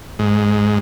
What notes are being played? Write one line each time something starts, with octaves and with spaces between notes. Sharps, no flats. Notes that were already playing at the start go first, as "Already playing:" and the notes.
G#2